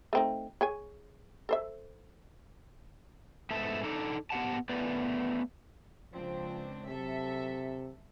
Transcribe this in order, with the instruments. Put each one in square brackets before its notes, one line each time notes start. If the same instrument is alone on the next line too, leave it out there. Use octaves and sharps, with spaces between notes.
[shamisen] A3 C4 D#4
G#4 C#5 G#5
A4 C5 E5
[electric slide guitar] G#2 B3 A4 E5 A5
D4 D#4 A4
B3 G4 F#5 A5
A3 B3 B4 D5
[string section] C#2 C4 D4 [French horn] F3
[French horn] C3 [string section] F#3 A4 E5